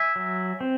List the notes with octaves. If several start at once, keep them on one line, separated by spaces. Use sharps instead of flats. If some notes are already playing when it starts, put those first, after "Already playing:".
Already playing: E5 G#5
F#3
C4